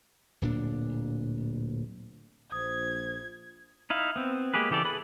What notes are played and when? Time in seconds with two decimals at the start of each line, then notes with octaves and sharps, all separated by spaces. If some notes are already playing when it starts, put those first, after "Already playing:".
0.42 D1 A#2 D4
2.52 A#1 C5 D#6 G#6
3.90 D#4 E4 F5
4.16 B3 C4
4.54 G#3 A#3 G4 G#4 B4
4.70 C#3 E3 G4 A4 D5
4.85 G#4 A4 B4 B5